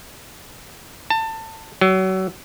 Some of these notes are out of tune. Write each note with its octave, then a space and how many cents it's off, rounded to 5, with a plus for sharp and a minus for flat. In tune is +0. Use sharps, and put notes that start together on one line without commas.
A5 +25
F#3 +30